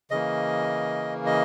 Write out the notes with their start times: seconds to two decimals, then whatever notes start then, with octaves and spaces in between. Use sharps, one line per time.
0.11 C#3 E3 A#3 D#5
1.26 D#5